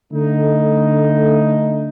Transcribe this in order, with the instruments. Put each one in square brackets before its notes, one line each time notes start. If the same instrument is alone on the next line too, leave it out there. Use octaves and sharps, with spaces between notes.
[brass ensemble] D3 A3 D#4